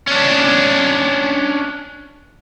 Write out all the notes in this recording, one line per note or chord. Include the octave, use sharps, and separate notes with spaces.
C#4 D4